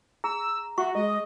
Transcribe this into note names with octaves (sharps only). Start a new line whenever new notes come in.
G#4 A#5 E6
F#4 E5 C#6
G#3 D#5